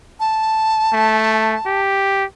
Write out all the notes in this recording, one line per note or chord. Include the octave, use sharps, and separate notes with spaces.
A5
A3
G4